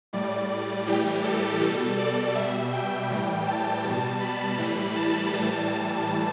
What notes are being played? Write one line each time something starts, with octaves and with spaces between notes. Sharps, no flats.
A2 G3 D5
A2 E3 G3 G4
A4
B2 G3
D5
B2 G3 E5
G5
A2 E3 G3
A5
B2 G3
B5
A2 E3 G3
A5
A2 E3 G3